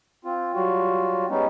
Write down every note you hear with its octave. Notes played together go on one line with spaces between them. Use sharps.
C4 F4
F#3 G3 F4 F#4
G3 G#3 B3 C#4 D#4